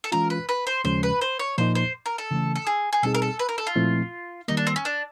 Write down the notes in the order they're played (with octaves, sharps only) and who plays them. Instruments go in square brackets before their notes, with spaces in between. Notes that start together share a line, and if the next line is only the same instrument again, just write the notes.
[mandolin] A4
[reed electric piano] E3 G#3 C#4 F4 [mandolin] A#4
[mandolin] B4
B4
C5
[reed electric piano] D#2 C#3 F3 G#3 C#4 [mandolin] C5
[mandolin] B4
C5
C#5
[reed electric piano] A#2 F3 A#3 D#4 [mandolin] C5
[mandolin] C5
A#4
A4
[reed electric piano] C#3 E3 A3 C#4
[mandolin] A4
G#4
G#4
[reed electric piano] B2 G3 C4 D#4 G#4 [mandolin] A4
[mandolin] A#4
A4
B4
A#4
A4
F4
[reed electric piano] A#2 F3 A3 C4 E4
[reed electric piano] D#3 G3 A#3 [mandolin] D#4
[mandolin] D4
C4
C#4
D4